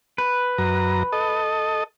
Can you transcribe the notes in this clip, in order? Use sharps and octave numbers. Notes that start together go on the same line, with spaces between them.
B4
F#2 A#5
A4 D#5